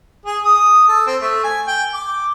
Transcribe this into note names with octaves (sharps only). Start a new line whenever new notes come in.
G#4
D#6
A4
C4
A3
G#5
G5
D6